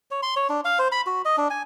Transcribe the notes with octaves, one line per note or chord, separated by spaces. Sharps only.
C#5
C6
C#5
D4
F5
C5
B5
F#4
D#5
D4
G#5